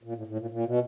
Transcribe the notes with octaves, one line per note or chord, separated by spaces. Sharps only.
A#2
A2
A2
A#2
A#2
B2